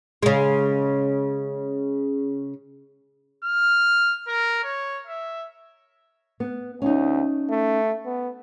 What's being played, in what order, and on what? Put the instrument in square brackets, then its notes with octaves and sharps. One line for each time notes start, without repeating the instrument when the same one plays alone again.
[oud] C#3 G#3
[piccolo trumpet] F6
A#4
C#5
E5
[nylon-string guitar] B3
[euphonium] D2 [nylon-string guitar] C#4 D#4
[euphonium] A3
B3